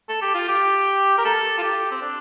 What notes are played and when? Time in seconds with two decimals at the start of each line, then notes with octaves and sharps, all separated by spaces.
0.09 A4
0.22 G4
0.35 F4
0.48 G4
1.18 A#4
1.25 A4
1.58 F4
1.63 G4
1.91 C4
2.02 D4